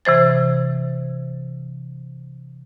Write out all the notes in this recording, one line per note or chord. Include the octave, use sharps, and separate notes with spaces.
C3 E3 C5 A6